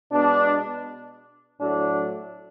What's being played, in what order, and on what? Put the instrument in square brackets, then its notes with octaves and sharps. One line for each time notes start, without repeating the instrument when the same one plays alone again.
[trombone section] B2 G#3 B3 D4
A2 F#3 A3 D4